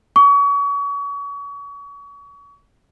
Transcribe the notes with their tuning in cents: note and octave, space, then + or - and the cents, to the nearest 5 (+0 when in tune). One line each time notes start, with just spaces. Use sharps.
C#6 +35